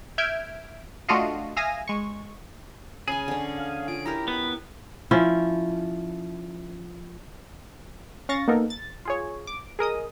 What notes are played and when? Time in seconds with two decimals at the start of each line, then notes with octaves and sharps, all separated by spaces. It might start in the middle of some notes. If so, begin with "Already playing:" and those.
0.18 E5 F6 G6 G#6 D7
1.08 A3 D4 F4 F#4 D#5 F5
1.57 E5 F5 G#5 D#6 A#6
1.88 G#3 C#6
3.08 C#3 G#4 G#5
3.28 D3 C#4
3.57 F5
3.88 F4 D7
4.06 E4 G4 A#4 A#5
4.28 B3 B5
5.11 F3 C#4 E4
8.29 C#4 F5 C#6 A6 A#6
8.48 A#3 B3 D#4 A4 A#4
8.70 A6
9.05 F4 G#4 C#5
9.47 D6
9.79 G#4 A#4 D#5 D#6